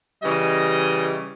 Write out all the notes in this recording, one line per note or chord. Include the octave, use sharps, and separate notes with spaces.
C#3 E3 G3 D#5